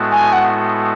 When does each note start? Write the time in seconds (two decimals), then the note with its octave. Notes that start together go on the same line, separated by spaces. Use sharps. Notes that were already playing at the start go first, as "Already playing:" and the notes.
Already playing: A2 G#3 B3 F#4 A4
0.11 G#5
0.33 F#5